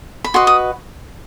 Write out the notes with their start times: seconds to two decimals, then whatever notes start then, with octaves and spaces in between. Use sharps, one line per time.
0.24 B5
0.34 F#4 B4 D#5 C6
0.47 D#6